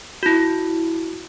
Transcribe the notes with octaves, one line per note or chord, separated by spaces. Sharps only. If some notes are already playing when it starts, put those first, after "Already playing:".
E4 F#4